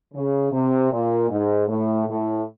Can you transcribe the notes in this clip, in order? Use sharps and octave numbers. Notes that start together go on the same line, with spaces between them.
C#3
C3
A#2
G#2
A2
A2